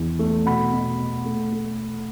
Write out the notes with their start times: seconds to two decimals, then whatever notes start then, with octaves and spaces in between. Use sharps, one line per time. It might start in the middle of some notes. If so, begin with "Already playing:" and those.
Already playing: E2 E3
0.19 A3
0.46 B2 F#5 B5
0.73 B2
0.99 B2
1.25 A3
1.53 A3